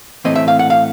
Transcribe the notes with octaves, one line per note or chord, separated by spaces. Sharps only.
A2 E3 A3 C4 D#5
E5
F5
F#5
F5